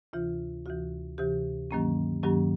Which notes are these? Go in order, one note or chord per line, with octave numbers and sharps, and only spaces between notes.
D2 C3 E3 F4
D2 C3 E3 F#4
D2 C3 E3 G4
G2 D#3 F#3 A#3 C#4
G2 D#3 F#3 A#3 C#4 G4